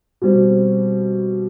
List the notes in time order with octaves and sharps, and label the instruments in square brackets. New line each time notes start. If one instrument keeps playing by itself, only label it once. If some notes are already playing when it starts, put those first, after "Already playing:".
[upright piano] B2 G3 C4